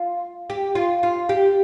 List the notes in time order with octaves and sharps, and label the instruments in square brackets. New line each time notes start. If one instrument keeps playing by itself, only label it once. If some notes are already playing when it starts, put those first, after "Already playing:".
Already playing: [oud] F4
G4
F4
F4
G4